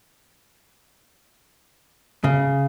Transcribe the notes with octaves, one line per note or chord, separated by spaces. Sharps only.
C#3